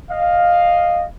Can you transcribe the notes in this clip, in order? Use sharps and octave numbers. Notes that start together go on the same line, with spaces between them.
D#5 F5